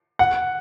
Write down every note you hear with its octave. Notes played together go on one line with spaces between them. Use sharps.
F#5